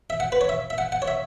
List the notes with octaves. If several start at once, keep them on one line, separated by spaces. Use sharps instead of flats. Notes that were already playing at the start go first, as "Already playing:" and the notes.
E5
F#5
B4
C#5
E5
E5
F#5
F#5
C#5
E5